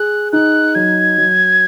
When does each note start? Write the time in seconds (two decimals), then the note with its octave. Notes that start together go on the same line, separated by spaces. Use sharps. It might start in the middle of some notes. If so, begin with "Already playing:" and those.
Already playing: G#4 F#6
0.32 D#4 F#6
0.75 F#3 G#6
1.18 F#3